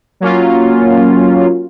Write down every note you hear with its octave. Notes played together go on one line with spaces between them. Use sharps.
F#3 A#3 C#4 F4